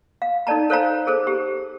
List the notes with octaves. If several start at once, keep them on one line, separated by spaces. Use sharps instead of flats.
F5
D#4 A4 C#5 D5 A5 A#5
A4 C5 C#5 F5 G#5 A#5
G#4 A4 C5
G4